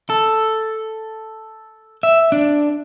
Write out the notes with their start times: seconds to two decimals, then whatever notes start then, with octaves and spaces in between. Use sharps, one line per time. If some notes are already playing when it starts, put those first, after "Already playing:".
0.10 A4
2.03 E5
2.32 D4